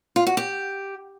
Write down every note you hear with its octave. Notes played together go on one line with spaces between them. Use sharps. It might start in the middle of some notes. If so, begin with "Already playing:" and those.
F4
F#4
G4